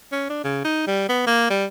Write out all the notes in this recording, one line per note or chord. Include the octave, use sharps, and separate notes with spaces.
C#4
D4
C#3
D#4
G3
B3
A#3
G3